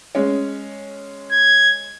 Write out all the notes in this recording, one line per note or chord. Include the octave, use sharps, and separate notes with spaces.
G#3 C#4
G#6